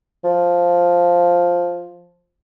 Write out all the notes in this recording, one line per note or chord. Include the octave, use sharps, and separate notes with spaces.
F3